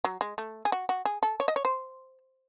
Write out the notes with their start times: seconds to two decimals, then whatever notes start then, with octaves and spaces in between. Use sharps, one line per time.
0.04 F#3
0.21 G#3
0.38 A3
0.65 G#4
0.72 F#4
0.89 F#4
1.05 G#4
1.23 A4
1.40 C#5
1.48 D#5
1.56 C#5
1.65 C5